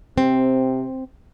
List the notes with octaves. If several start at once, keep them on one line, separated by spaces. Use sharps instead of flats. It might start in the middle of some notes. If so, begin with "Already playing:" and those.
C3 C4